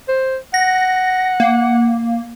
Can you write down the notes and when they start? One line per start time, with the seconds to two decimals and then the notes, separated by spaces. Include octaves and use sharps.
0.09 C5
0.54 F#5 A#6
1.40 A#3